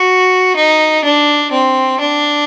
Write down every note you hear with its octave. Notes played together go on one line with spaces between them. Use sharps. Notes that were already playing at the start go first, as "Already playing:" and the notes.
Already playing: F#4
D#4
D4
C4
D4